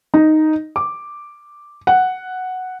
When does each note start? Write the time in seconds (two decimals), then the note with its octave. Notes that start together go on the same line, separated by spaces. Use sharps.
0.14 D#4
0.76 D6
1.87 F#5